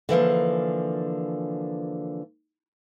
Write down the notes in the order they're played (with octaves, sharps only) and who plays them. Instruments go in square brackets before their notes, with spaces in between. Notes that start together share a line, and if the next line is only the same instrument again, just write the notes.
[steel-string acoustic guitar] D3 E3 F3 A#3